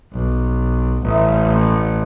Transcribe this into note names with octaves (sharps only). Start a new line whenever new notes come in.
B1
A1